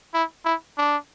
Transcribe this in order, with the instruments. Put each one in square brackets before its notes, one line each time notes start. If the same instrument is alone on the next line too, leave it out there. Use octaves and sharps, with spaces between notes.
[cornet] E4
E4
D4